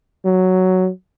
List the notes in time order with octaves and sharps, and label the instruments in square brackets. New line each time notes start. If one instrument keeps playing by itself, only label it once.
[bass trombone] F#3